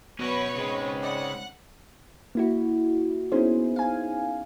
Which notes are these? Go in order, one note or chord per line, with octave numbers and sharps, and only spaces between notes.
B2 C#4 F#4 B4 C#5 A#6
G#2 C#3 G#3 C4 C#4
B4 D5 D#5 F#5
A#3 E4 F#4
B3 C#4 D#4 E4 G#4 C5
F5 G#5